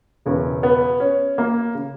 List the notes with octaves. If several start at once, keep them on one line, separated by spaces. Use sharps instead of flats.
E1 E2 C#3
B3
C#4
A#3
C#3